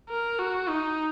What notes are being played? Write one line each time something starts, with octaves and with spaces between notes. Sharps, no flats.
A#4
F#4
D#4